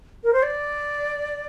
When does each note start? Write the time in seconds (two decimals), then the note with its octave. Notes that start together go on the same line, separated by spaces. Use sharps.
0.24 A#4
0.33 C5
0.43 D5